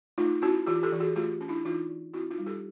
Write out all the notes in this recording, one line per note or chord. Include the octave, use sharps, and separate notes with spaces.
A3 D#4 F4
C#4 E4 F#4
E3 F4 G4
G4 A4
E3
F#4 G#4
A3 F4 G4
C#4
D4 E4
E3 D#4 F4
E3
C4 E4 F#4
D#4 F4
G3
G4 A4